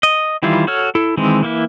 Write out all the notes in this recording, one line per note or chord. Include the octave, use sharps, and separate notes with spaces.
D#5
D#3 E3 G3 E4 F4
F#4 A4 C#5 F6
E4 A4
D#3 E3 G#3 C4
E3 A#3 E4